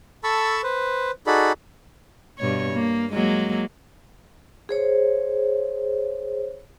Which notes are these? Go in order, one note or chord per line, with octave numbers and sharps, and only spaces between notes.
A4 A5 B5 C#6 E6
B4 C5
D#4 F#4 G#4 A4 D5 B5
G2 B2 C#5
A#3
F#3 G#3 A#3
G#4 C5 C#5